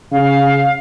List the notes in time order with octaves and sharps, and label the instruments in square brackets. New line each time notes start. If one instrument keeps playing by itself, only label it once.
[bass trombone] C#3 [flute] F5